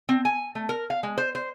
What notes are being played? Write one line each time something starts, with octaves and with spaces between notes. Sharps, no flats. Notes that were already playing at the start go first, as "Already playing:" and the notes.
C4
G#5
A3
A#4
F5
G#3
C5
C5